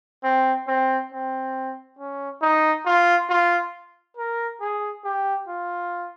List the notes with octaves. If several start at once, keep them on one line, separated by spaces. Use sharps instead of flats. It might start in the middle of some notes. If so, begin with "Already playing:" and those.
C4
C4
C4
C#4
D#4
F4
F4
A#4
G#4
G4
F4